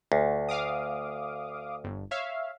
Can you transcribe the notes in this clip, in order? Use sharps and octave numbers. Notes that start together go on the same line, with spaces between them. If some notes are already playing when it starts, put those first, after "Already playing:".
D2
F5 D6 D#6
G1
C#5 E5 F5